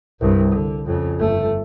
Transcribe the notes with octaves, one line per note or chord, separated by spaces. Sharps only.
C2 G2
D3
F2 C#3
G1 A3